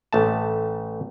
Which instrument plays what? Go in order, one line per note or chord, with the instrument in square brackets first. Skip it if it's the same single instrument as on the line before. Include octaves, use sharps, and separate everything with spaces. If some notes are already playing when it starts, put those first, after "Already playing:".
[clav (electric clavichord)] A1 A3 A5